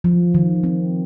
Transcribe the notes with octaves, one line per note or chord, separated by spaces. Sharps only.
F3
D#3
C4